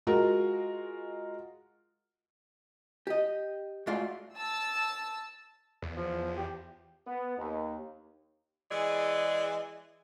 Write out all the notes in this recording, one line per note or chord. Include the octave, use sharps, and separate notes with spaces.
G#3 F4 F#4 A#4
G4 D#5
G#2 A3 F4 F#4 D5 F5
A5 E6
E2
F3
G4
B3
D#2
E3 G#3 G#4 D5